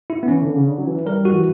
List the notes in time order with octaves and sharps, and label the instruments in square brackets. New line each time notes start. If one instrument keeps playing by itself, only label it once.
[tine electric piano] E4
B3
[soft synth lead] E3 [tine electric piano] C#4
[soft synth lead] D3
C#3
D3
F#3
E3
[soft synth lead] G3 [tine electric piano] A#4
[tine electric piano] F#4
[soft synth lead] E3